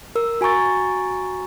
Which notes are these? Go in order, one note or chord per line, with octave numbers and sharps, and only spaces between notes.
A#4 E6
F#4 G#5 A#5 C#6 A6